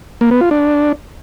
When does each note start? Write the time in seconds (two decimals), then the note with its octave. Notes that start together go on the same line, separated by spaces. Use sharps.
0.21 A#3
0.31 B3
0.41 F4
0.51 D4